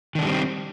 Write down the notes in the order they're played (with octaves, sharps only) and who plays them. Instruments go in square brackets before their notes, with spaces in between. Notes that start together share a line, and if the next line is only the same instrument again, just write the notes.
[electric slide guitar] D#3
D4
G#3
G3
C4